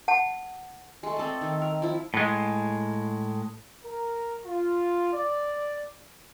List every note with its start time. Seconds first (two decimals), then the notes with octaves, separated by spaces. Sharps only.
0.08 F#5 A5
1.03 G#3 A3
1.17 C4 A4 D5 D#5
1.41 D#3
1.61 A#4
1.82 F3 E4
2.14 A2 G#3
3.83 A#4
4.45 F4
5.13 D5